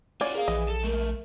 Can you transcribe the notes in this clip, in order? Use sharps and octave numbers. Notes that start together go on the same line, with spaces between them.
C#4 F4 F#4 C#5 D5
G#4 A#4 F5
A#1 E3 D#5
A4
A3 A#3 A#4